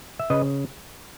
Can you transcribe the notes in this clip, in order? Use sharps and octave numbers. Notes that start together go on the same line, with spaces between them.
E5
C#3 B4 D#5